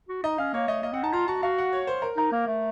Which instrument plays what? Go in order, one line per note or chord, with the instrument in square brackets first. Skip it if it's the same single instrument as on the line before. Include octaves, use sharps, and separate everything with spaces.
[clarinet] F#4
[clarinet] D#4 [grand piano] D#5
[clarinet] C#4 [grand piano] F5
[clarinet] A#3 [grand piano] C#5
[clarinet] A3 [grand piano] D#5
[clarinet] A#3 [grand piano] D#5
[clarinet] C4 [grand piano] F#5
[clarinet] D#4 [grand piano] A5
[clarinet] F4 [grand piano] A#5
[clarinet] F#4 [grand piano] A5
[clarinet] F#4 [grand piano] F5
[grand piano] F#5
C#5
C5
A#4
[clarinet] D#4 [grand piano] A#4
[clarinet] A#3
A3